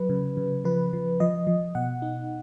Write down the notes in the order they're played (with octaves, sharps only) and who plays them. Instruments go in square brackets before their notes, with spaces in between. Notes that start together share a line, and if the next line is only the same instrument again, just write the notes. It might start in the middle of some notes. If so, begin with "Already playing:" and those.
Already playing: [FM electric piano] F#3 B4
C#3
C#3
F3 B4
F3
F3 D#5
F3
B2 F#5
D#4